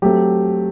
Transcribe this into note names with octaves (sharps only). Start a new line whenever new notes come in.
F#3 A3 C4 G4